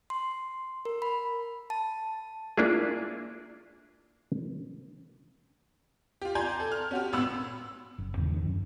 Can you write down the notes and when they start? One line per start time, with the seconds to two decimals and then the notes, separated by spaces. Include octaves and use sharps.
0.10 C6
0.85 A#4
1.02 B5
1.70 A5
2.57 A#3 D4 E4 F4 G#4
6.22 F4 G4
6.35 D5 G#5 A#5 C6 G6
6.60 A4
6.72 F6
6.91 C#4 F#4 G4
7.13 G#1 A#2 B3 B5 E6
7.98 F#1
8.17 E2 G2 C#3 E3
8.30 F2 D#3 D4
8.45 F#2